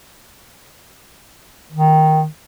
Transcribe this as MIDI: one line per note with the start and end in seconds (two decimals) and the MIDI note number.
1.72 2.25 51